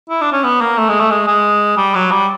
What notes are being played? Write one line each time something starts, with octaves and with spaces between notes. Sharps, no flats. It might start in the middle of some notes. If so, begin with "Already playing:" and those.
E4
D4
C#4
B3
A#3
A3
G#3
A3
G#3
G#3
G3
F#3
G3